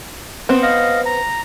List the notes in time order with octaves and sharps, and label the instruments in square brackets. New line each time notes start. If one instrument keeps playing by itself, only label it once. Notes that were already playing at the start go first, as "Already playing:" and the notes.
[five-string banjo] B3 C4
[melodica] D#5 F5
A#5